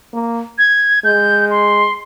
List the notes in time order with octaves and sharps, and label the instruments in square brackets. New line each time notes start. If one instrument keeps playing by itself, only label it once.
[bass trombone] A#3
[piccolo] G#6
[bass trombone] G#3 [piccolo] G6
[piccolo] C6